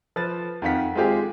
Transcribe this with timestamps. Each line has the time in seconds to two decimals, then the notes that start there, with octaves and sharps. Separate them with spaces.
0.16 F3 B4 A6
0.62 F2 D#3 F5 F#5 B6
0.95 G#3 C4 F4 G4 G#4